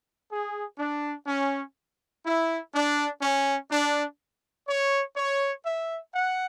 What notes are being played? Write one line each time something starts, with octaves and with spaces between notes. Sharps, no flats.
G#4
D4
C#4
E4
D4
C#4
D4
C#5
C#5
E5
F#5